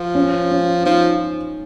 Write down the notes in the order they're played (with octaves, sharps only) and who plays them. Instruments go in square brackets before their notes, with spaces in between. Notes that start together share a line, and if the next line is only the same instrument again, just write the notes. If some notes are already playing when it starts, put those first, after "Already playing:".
Already playing: [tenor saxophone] F3
[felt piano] C#4
C#4
[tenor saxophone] F3 [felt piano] D#4